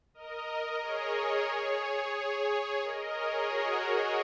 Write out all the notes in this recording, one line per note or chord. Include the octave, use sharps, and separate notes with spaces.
A#4 D#5
G#4 C#5
G#4 C#5
G#4 C#5
G#4 C#5
A#4 D#5
G#4 C#5
F#4 A#4
G#4 C#5